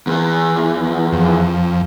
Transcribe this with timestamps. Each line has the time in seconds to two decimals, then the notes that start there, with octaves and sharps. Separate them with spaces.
0.07 E2 E3
1.13 F2